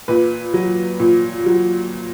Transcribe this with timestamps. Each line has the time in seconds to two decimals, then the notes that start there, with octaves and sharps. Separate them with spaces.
0.08 A#2 B4
0.54 F#3
1.00 A#2
1.46 F#3